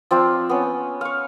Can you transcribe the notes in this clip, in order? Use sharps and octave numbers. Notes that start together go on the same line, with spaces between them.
F3 C4 D5 F5
B3 C#4
F5 C#6